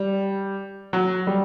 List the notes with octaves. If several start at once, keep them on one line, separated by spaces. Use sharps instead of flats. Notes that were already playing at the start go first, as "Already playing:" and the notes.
Already playing: G3
F#3
G3